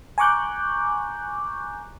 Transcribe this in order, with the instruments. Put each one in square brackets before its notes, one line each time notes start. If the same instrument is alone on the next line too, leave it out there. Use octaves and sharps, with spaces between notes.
[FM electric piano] G#5 A#5 C#6 D6 F#6 G6